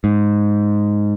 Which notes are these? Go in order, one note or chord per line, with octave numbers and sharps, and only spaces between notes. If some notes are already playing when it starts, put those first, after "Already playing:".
G#2